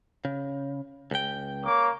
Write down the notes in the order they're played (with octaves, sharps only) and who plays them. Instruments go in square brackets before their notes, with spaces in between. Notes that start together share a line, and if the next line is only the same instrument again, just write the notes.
[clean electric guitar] C#3
C#2 G5
[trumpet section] A#3 C#5 D6